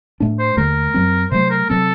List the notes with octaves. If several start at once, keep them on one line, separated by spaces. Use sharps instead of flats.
A2 A3 D4
C5
D#2 D3 A3 A#4
F#2 F#3 C4
C3 F#3 A3 C5
A#4
C3 F#3 C4 A4